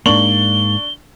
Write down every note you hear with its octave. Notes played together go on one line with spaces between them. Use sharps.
G#2 A#3 D4 C#6 F#7 G7